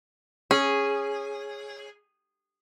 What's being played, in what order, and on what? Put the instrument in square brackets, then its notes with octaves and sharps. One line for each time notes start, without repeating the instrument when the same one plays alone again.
[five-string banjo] C#4 [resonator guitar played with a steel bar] G#4